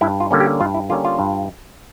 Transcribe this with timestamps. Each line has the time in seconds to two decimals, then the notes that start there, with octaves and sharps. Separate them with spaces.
0.01 G2 E4
0.20 F4
0.31 D3 G3 A#3 C#4
0.40 G4
0.60 G2 F4
0.74 E4
0.89 D3 G3 A#3 C#4 F4
1.05 F4
1.19 G2